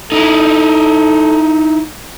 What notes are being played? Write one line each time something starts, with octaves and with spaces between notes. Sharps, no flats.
D#4 E4 A4